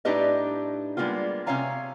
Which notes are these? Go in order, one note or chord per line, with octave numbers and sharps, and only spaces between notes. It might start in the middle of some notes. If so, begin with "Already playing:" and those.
A2 D4 D#4 G4 B4 D#5
G3 G#3 A#3 B3 F4
C3 C#4 C#5 F5 G#5 A#5